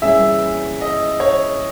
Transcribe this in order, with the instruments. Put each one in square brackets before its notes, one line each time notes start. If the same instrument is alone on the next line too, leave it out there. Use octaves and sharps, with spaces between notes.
[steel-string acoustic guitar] G2 E3 A#3 C#4 G#4 [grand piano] E5
[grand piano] D#5
C#5